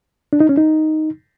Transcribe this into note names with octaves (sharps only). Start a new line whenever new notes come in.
D4
D#4
C#4
D#4